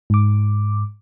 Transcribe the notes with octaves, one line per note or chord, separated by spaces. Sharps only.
G#2 D6